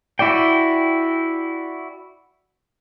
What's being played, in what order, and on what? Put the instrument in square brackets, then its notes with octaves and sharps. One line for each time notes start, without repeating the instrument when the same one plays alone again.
[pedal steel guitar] E4 F#4 D5 G5